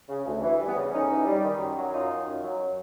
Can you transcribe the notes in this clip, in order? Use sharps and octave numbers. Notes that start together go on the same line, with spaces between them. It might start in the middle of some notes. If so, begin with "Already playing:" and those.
C#3
D2
E3
G3
B3
C#3
D2 C#4 D#4
E3
G3
D#3
F#2
F#3
F#2 D#4 F4
D#3
F#2
F#3